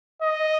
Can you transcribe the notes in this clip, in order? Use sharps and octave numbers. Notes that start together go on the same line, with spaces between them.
D#5